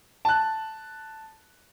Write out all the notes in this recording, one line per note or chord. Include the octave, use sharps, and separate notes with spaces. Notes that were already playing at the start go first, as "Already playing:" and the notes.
A5 F#6